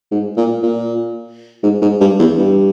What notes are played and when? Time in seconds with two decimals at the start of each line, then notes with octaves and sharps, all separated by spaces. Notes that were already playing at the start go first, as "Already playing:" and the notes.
0.11 G#2
0.37 A#2
0.63 A#2
1.63 G#2
1.82 G#2
2.01 G2
2.19 E2
2.37 G2